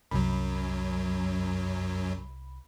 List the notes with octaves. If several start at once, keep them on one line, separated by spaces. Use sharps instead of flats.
C2 F#2 F#3 B5